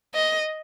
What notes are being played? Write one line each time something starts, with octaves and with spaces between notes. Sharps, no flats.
D#5